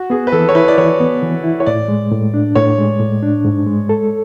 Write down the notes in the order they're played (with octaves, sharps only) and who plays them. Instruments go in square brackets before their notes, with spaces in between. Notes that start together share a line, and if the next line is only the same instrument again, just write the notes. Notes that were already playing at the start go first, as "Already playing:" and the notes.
Already playing: [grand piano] F#4
[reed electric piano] B3 [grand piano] G#4
[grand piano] B4
[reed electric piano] E3 [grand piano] A4
[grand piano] C#5
[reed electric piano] E4 [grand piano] B4
[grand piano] D5
[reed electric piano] E3 [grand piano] C#5
[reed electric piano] B3
E3
E4
[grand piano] C#5
[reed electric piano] A2 [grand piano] D5
[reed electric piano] G#3
A2
D4
[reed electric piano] A2 [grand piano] C#5
[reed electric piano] G#3
A2
D4
G#2
G#3
A4